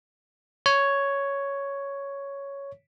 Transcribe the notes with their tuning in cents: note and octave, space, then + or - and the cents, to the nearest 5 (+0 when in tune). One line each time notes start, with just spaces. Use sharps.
C#5 +5